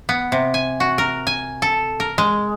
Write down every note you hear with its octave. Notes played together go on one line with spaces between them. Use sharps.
B3
C3
G#5
F#4
A#4
G#5
A4
A#4
G#3